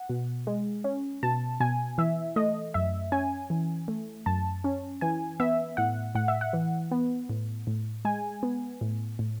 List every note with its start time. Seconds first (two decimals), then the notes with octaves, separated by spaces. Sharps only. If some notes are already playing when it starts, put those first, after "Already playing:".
Already playing: F#5
0.09 B2
0.47 G#3
0.84 C#4
1.23 B2 A5
1.60 B2 G#5
1.98 E3 E5
2.36 A3 D#5
2.74 F#2 E5
3.12 C#4 G#5
3.50 E3
3.88 A3
4.26 F#2 A5
4.64 C#4
5.01 E3 G#5
5.40 B3 E5
5.77 A2 F#5
6.15 A2 F#5
6.28 E5
6.41 F#5
6.53 E3
6.91 B3
7.30 A2
7.67 A2
8.05 G#3 G#5
8.43 B3
8.81 A2
9.19 A2